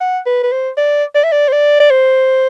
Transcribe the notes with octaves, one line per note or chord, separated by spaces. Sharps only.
F#5
B4
B4
C5
D5
D5
E5
D5
C5
D5
D5
C5